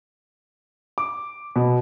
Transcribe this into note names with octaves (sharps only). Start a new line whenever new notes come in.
D6
B2